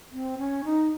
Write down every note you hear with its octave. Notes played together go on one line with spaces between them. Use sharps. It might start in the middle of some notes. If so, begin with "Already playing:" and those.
C4
C#4
D#4